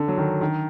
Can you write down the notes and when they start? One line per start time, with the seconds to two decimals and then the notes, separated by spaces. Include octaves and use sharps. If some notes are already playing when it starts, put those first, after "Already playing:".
Already playing: D3
0.08 F#3
0.18 D#3
0.41 D#3